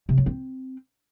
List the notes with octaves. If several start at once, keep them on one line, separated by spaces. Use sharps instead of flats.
C3
F#3
C4